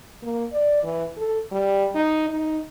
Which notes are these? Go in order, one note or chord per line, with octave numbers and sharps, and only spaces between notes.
A#3
D5
E3
A4
G3
D#4
D#4